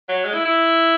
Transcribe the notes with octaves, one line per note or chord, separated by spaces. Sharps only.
F#3
G#3
E4
E4